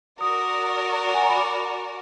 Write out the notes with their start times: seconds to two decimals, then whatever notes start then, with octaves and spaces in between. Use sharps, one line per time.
0.20 F#4 A#4 D5 D#6
1.07 F#5
1.14 G#5
1.22 A#5
1.29 B5
1.37 D6